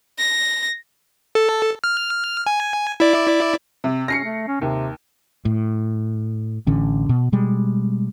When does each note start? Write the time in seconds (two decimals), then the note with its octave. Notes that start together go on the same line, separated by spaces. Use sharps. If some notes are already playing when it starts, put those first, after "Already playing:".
0.19 A#6
1.35 A4
1.84 F6
2.46 G#5
3.00 E4 D5
3.84 C3
4.08 C#4 A#6 C7 C#7
4.24 A3
4.48 C#4
4.61 D#2 C3
5.45 A2
6.67 A1 D3 C#4
7.09 B2
7.32 B2 G3 G#3